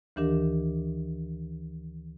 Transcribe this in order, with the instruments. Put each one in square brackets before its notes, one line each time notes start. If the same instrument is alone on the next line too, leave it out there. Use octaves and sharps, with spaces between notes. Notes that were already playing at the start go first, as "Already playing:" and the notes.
[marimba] D2 D#3 E3 D4 G4 A#4